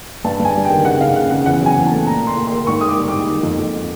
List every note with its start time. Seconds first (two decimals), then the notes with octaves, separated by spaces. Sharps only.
0.24 G2 A5
0.40 G2
0.45 G#5
0.55 G3
0.65 G5
0.70 D#3
0.85 C#3 F#5
1.01 C#3 F5
1.15 C#3 F#5
1.30 C#3 F#5
1.46 E2 F#5
1.61 F#3
1.66 G#5
1.76 E2
1.87 A3 A5
2.07 A#2 A#5
2.22 A#2 C6
2.37 A#2
2.47 A#3 C6
2.67 G#2 C#6
2.81 A#3 D#6
2.87 D6
2.98 G3
3.08 G#2 D6
3.28 D#3
3.43 F2
3.58 F2